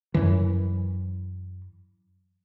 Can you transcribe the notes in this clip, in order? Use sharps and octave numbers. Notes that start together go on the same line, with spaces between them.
F#2 E3